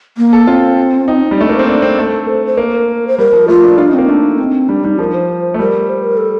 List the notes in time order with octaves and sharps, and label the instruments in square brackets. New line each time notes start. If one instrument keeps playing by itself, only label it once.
[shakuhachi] A#3
[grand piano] A4
[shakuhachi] C4 [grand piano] F4
[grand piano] D#4
G3
[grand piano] A3 [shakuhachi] D4
[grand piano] A#3 [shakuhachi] C5
[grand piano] C4
D4
C4
[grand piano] A3 [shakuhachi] A4
[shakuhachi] C5
C5
[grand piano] A#3 [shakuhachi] A#4
[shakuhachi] C5
[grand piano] G3 [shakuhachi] A#4
[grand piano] F3
[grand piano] A3 [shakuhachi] F4
[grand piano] D4
[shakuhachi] D4 [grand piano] F4
[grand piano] D#4
[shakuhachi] C4
[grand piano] A#3
[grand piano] A3 [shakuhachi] D4
[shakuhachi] C4
[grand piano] G3 [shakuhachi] D4
[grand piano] G3 [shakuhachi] D#4
[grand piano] F3 [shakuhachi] A#4
[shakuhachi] C5
[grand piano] A3
[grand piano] G3 [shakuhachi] A#4
[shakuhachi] C5
A#4
A4